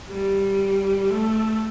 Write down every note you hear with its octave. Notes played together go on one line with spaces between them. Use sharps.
G3
A3